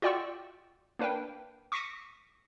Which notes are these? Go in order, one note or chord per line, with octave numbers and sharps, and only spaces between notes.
F4 F#4 D5 G5 C#6 E6
A#3 D4 B4 F5 G5
C#6 D6 A#6 B6 C#7 D#7